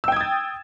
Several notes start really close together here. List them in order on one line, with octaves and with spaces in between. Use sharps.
E6 G5 G#6 D#6 A6